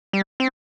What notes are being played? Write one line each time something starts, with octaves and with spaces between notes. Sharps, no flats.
G3
C4